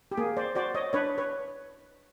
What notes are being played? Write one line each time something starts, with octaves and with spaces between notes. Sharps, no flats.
G4
A#3 G#4
C5 D5
F#4 C5 D5
C#5 D#5
D4 B4 C#5
B4 C#5